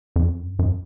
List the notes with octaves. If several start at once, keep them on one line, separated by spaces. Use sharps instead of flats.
F2
F#2
F#2